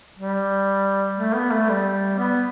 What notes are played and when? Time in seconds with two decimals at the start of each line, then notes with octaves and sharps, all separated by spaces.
0.18 G3
1.18 A3
1.35 B3
1.51 A3
1.68 G3
2.18 B3